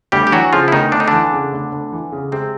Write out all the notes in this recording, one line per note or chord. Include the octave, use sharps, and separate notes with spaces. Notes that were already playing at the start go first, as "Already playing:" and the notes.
D2 G3 G4
G4
E3 F#3 F#4
C#3 F3 F4
E4
D2 D#3 D#4
D2 D4
D#4
D3 E3 D4
C#3
D2
D2
E3
C#3
C3 G#3 C4